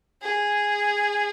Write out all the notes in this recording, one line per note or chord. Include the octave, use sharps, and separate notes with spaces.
G#4